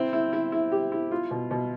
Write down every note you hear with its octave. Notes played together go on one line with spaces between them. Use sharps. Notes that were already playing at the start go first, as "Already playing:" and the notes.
Already playing: C4 E4
E4
E4
E4
G4
E4
F4
B2
B2